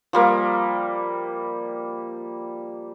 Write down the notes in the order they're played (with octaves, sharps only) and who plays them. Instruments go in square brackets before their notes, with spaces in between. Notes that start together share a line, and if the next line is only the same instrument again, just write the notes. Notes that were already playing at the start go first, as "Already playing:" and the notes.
[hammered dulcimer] F3 G3 A#3